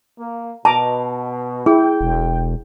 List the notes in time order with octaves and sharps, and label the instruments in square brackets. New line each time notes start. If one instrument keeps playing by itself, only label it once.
[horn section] A#3
[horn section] B2 [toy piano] A5 [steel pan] A#5 D6
[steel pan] E4 [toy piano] G#4 [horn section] G5
[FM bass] E1